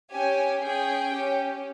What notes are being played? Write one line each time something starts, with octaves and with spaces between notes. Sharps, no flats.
C#4 G4 G#5
C#4 G#4 G5
C#4 G4